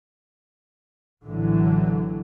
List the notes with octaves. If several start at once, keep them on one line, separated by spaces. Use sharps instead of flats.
A#1 A2 D3 E3 F#3